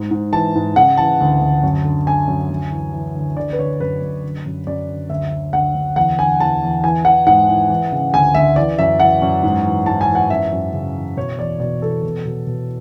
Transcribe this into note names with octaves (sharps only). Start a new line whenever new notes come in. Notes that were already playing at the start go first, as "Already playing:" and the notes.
Already playing: G#2
G#2
E3 A5
G#2
C#3 F#5
E3 A5
D2
D2
F#2
D3
D3 G#5
F#2
D2
E3
E3
D2
D3 D5
B4
D3 C#5
F#2 B4
F#2
D3
F#2
F#2 D5
D3
D2 E5
D3
D2 F#5
D2
E2 F#5
D3 G#5
E2 A5
E2
E3 G#5
E3 F#5
G#2 F#5
E3
E3
C#3
D2 G#5
D2 E5
E3 D5
F#2 E5
E3 F#5
F#2
G#2
E3
G#2 A5
G#5
E3
F#5
F#2 E5
F#2
C#3
E3
B2 C#5
E2 D5
B2 D5
E2 A4
B2
B2
B2